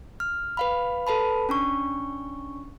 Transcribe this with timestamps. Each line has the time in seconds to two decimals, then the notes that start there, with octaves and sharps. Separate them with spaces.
0.20 F6
0.57 B4 F5 B5
1.07 A4 B4 A5 B5
1.49 C#4 D4 C#6